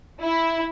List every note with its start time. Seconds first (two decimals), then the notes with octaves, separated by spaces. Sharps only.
0.22 E4